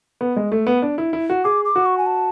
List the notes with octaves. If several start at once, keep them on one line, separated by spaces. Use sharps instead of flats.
B3
G#3
A3
B3
D4
E4
E4
F#4
G#4 D6
D6
F#4
C#6
G#5
A5